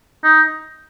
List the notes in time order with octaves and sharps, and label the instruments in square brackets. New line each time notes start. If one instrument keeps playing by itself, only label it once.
[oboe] D#4